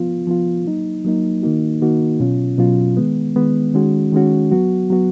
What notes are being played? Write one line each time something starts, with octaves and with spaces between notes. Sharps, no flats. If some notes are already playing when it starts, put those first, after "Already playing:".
Already playing: F3 B3 F4
F3 B3 F4
F#3 A#3 D#4
F#3 A#3 D#4
D#3 A#3 D#4 F#4
D#3 A#3 D#4 F#4
B2 F#3 C#4 F4
B2 F#3 C#4 F4
D#3 G#3 B3
D#3 G#3 B3
D#3 G#3 C#4 F#4
D#3 G#3 C#4 F#4
F#3 B3 F#4
F#3 B3 F#4